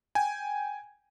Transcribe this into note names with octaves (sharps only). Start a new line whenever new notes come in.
G5 G#5